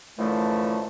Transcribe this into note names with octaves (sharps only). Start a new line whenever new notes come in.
F#2 D3 E3 F3 A3